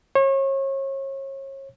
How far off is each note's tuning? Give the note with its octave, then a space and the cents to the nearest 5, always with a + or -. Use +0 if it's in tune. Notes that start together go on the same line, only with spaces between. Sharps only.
C#5 -35